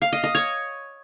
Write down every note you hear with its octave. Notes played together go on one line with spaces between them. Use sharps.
F5
D#5
D#5
C#5